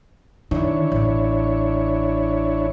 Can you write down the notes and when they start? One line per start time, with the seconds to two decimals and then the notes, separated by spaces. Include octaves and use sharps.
0.51 D#3 D4 E4 C#5
0.92 A1